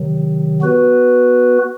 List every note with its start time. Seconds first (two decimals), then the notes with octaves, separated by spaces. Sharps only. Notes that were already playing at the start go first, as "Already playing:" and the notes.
Already playing: C3 D#3 F#3
0.61 B3 F#4 B4